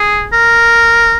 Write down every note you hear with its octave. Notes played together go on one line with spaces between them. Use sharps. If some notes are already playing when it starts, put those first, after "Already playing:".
Already playing: G#4
A#4